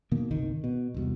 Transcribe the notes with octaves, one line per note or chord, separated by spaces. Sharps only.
B2 D#3 A#3
G1 C2 D#3
B2
E1 C2 B2